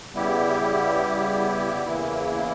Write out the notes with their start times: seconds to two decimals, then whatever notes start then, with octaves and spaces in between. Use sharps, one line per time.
0.14 C#3 G3 B3 E4 G4
1.85 E2 C#3 E3 A#3 E4